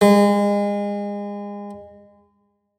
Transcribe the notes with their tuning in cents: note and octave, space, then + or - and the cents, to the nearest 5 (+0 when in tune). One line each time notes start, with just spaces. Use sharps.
G#3 -35